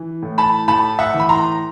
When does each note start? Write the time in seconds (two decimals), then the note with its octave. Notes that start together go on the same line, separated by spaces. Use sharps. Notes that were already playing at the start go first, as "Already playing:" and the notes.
Already playing: E3
0.22 A2
0.38 A5 B5
0.68 A2 A5 B5
0.99 E5 F#5
1.14 E3
1.20 B5
1.29 A#5 C6